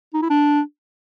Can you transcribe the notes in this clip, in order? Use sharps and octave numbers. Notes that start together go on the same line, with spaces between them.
D#4
E4
D4